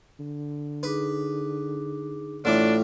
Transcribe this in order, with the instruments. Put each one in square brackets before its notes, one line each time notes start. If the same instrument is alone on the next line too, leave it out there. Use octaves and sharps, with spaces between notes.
[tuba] D3
[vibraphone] D#4 G#4 D6 [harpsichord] B4
[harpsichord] A1 A2 D6 [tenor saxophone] D4 [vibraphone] E4 F4 A4